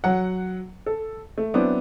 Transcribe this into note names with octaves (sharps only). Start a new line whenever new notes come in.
F#3 F#5
A4
A3
F#3 B3 C4 D4 E4